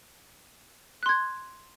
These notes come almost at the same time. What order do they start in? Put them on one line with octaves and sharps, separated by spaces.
F#6 C6 G#6